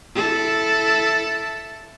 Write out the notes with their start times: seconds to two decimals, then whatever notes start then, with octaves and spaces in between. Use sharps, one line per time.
0.15 E4 A4